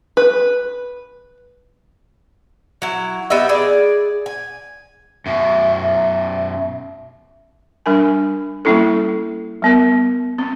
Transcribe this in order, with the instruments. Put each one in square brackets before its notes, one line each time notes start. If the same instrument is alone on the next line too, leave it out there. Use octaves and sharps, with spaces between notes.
[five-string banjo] B4
[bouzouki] F#3 E4
B3 G4 D#5 E5
G#4 D5
G#5
[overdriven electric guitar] F#2 B2 [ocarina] E5
[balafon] G3 D4 A#4 G#5
G3 A#3 C#4 E4 A4
G3 B3 A#4
C4